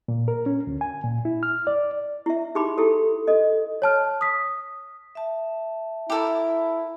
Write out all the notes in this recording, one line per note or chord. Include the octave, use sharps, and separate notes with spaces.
A#2
A#4
C#4
D2
G#5
A#2
E4
F6
D5
E4 E5
D#4 G4 G#4 B5 C6 D6
E4 G4 A4
A4 D#5
C#5 A5 F6
D#6 B6
E5 A5
E4 G4 A4 A#4